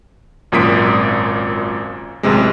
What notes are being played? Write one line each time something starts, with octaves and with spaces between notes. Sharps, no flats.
G#1 F#2 A#2 D#6 B6 D7
A1 F#2 C3 G#3